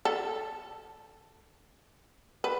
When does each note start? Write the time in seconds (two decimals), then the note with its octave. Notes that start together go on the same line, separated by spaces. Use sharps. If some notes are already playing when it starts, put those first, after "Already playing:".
0.05 A4
2.44 B4